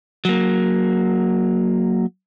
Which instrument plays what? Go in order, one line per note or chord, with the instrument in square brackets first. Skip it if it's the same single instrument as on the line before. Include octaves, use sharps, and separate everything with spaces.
[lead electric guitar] F#3 A#3